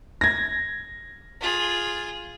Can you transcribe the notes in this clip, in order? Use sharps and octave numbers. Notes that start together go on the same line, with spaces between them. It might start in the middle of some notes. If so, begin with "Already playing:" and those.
G#6 A#6
F4 G#4